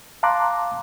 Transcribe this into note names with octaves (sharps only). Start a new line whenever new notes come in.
F5 A5 A#5 C6 D6 F#6